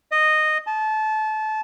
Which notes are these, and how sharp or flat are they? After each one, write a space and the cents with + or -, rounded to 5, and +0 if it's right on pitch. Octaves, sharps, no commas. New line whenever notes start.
D#5 -10
A5 -25